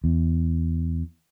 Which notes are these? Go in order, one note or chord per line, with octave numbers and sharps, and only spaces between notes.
E2